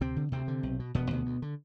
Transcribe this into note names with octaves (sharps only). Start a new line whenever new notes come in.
D2 C3 C4
D3
D2 C3 C4
D3
B1
B2
E1 B2 B3
D2 C3
D2
D3